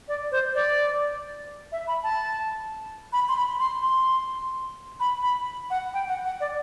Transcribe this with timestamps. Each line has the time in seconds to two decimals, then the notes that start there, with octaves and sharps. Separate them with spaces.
0.08 D5
0.32 C5
0.55 D5
1.72 E5
1.88 B5
2.03 A5
3.13 B5
3.29 C6
3.36 B5
3.60 C6
3.83 C6
5.00 B5
5.23 B5
5.70 F#5
5.94 G5
6.09 F#5
6.25 F#5
6.40 D5